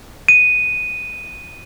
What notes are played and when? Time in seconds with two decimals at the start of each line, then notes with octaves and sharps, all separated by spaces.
0.28 D#7